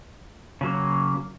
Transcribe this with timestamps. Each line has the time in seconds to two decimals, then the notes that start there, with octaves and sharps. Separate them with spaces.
0.61 C#3 F#3 A#3